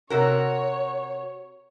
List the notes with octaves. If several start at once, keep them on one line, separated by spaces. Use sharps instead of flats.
C3 F#4 A#4 C#5